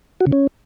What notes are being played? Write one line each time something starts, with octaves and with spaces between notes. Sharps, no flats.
F#4
C#3
C#4